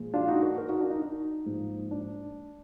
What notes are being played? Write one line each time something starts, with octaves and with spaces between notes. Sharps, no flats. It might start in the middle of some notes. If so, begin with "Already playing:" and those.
Already playing: A#2 F3 G#3
D4 F4
D#4 F#4
F#4 A#4
F#4 A#4
D#4 F#4
D4 F4
D#4
D#4
G#2 F3 A#3
D4